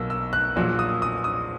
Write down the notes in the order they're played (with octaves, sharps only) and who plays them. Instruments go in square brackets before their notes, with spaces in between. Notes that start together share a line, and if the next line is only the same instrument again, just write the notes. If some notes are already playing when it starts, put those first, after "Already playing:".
Already playing: [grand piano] B1 B2 A#3 E6
E6
F#6
A#1 A#2 F#3 A#3 E6
D#6
D#6
D#6